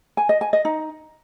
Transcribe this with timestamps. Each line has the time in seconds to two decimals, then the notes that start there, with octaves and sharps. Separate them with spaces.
0.17 G#5
0.29 D#5
0.41 G#5
0.53 D#5
0.65 D#4